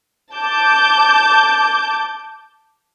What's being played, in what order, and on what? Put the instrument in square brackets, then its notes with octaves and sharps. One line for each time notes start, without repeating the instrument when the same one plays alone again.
[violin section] A5 D6 G6